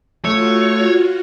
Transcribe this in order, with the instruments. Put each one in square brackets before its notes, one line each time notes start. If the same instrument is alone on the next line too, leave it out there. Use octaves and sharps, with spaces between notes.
[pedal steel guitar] A3 [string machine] F4 F#4 [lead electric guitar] C#5